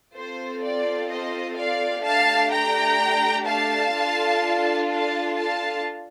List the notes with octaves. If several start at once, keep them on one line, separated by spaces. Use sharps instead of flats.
C4 F4 A4 C5
D5
C5 D#5
D5 F5
A3 D4 G4 F5 A5
G5 A#5
F5 A5
D4 F4 A4
F5 A5
F5 A5